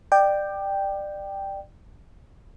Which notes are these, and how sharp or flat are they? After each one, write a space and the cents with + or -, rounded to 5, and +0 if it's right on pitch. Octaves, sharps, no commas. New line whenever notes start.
D5 +25 G5 +0